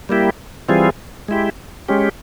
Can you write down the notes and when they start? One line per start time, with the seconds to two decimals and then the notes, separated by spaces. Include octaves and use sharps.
0.09 G3 A#3 E4 G4
0.68 E3 G3 C4 F4 G#4
1.28 G#3 E4 G4
1.88 G#3 C#4 G4